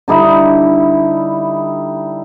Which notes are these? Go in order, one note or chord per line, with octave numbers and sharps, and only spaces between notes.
D3 G3 D#4 E4